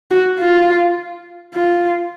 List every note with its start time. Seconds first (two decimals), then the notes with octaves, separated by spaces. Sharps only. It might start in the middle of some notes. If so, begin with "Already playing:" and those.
0.11 F#4
0.39 F4
1.54 F4